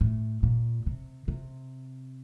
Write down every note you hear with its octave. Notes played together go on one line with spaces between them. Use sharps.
A2
A#2
C3
C3